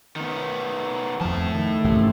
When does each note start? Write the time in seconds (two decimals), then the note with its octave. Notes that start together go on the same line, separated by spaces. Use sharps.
0.16 D#3 B3
1.21 F2 A2 F3 A5
1.55 D#3
1.84 A1 G#2 C3